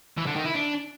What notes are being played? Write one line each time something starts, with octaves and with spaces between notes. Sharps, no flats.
E3
D3
D#3
E4
D4